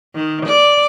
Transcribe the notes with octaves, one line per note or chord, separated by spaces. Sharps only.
D#3
D5